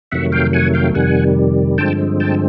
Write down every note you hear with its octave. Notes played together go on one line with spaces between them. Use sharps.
F2 C3 D#3 F#3 A3 E5 F#5
F5 G5
F#5 G#5
F5 G5
F2 C3 D#3 G3 F#5 G#5
G2 D3 F3 G#3 C4 G5 A5
G5 A5